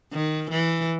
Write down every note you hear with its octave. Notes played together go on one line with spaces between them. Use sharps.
D#3
E3